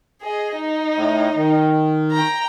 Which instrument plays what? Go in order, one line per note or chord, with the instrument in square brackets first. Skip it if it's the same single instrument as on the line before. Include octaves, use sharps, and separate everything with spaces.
[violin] G#4 D#5
D#4
[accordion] A2
D#3
[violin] G5 A#5